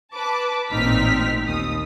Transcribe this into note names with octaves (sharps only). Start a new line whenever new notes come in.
B4 A5 D6
A1 A#2 C4 D#4 F6 B6
D#2 D#6